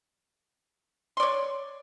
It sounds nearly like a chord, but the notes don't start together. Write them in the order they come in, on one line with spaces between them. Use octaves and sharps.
C6 D5 C#5